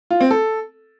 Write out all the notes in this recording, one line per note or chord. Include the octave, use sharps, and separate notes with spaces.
F4
C4
A4